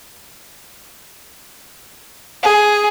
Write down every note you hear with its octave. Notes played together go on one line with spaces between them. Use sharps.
G#4